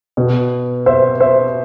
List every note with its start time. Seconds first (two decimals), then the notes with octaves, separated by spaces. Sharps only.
0.17 B2
0.86 C5 E5
1.20 C5 E5